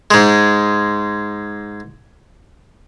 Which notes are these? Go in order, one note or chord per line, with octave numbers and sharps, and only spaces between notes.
G#2 G#3